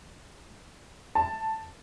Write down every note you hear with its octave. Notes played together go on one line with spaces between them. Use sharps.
A5